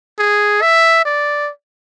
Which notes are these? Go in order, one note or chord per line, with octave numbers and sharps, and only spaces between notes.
G#4
E5
D5